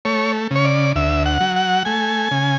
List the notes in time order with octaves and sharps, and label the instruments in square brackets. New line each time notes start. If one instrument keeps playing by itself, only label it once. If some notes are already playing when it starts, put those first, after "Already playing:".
[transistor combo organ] A3 C#5
C#3 C#5
D5
D2 E5
F#5
F#3
F#5
A3 G#5
C#3